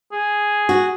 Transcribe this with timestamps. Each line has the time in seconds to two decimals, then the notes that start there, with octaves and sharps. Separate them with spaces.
0.12 G#4
0.69 F#4